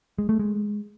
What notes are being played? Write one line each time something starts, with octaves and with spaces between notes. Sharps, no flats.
G#3
A3
G#3